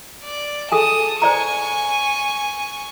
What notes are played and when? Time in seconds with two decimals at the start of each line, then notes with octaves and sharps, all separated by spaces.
0.24 D5
0.72 G#4 A4 G#5 A5 D#6
1.22 C5 D5 G#5 A#5 C#6